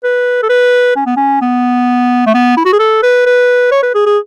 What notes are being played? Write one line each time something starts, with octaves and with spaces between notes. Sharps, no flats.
B4
A4
B4
C#4
B3
C#4
B3
A3
B3
E4
F#4
G#4
A4
B4
B4
C#5
B4
G#4
G#4